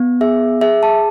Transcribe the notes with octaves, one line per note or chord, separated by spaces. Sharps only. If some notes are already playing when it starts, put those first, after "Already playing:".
Already playing: B3
G#4 E5
G#4 E5
A5